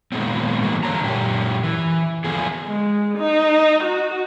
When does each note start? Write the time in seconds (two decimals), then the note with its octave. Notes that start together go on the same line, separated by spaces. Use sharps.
0.12 A#2 D#3 F3 G#3 B3 C4
0.63 E3 G3 A#3 F#4
0.83 D3 C#5 A5 A#5
1.04 F#2 A#2 C#4 G4
1.63 E3
2.24 D3 F3 G3 A3 B3 G#4
2.67 G#3
3.18 D#4
3.83 F#4